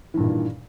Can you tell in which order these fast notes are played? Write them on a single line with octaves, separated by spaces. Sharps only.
E3 G2 A#2 D#3